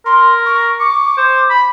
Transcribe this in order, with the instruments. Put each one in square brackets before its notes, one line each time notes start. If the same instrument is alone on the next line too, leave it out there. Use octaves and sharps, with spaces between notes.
[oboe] A#4 [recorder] C6
[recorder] C#6
[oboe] C#6 [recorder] D6
[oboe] C5
B5